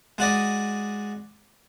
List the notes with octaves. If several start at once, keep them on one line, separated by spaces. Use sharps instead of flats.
G#3 F#4 D5 D#5